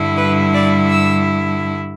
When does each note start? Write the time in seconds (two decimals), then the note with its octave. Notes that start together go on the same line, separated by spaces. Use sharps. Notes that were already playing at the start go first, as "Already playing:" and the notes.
Already playing: G2 D3 G3 E4
0.17 B4
0.53 D5
0.89 E6